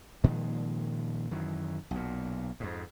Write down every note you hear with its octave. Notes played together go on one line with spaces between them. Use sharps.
A#2 D#3 F3 G#3
F#2 D#3 E3
B1 A#2
F2 G#2